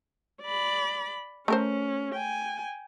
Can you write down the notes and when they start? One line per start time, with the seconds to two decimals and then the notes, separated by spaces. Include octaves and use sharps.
0.42 D5 B5
1.48 A3 C#4 A#4 C5
2.15 G5 G#5